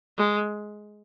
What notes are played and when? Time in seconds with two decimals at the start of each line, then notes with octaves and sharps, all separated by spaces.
0.18 G#3